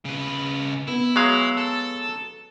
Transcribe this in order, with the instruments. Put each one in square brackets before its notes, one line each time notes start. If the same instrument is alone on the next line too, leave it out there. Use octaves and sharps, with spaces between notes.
[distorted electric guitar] C#3 B4
[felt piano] B3 [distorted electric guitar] E4
[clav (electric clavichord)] F#3 G#3 F5
[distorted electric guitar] A4